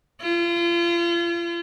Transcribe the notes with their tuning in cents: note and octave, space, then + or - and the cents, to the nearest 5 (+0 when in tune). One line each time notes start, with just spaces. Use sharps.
F4 -35